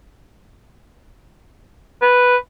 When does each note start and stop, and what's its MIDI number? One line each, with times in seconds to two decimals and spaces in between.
2.02 2.36 71